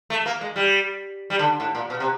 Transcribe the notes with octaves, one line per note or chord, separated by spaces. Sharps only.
A3
A#3
G#3
G3
G3
D3
A2
A#2
B2
C3